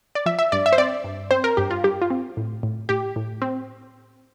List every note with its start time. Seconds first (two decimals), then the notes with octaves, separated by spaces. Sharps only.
0.15 D5
0.26 F3 E5
0.39 E5
0.52 G2 D5
0.66 E5
0.73 C5
0.78 C4 D5
1.04 G2
1.31 C4 C5
1.44 A#4
1.57 G2 G4
1.71 F4
1.84 G2 G4
2.02 F4
2.10 C4
2.37 A2
2.63 A2
2.89 A2 G4
3.16 A2
3.42 C4